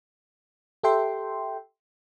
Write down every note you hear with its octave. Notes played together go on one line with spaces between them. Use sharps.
G4 A4 E5 G5 C6